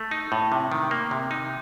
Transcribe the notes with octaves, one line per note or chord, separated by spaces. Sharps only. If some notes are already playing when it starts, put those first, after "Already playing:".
Already playing: A3
D#4
A2
C3
D#3
A#3
C3
D#4